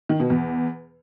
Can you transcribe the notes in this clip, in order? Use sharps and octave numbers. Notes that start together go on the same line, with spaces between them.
D#3
B2
E2